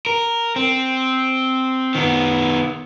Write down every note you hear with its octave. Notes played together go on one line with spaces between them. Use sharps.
A#4
C4
D#3 B3